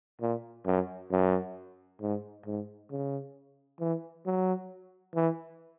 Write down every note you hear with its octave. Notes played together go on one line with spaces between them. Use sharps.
A#2
F#2
F#2
G#2
G#2
C#3
E3
F#3
E3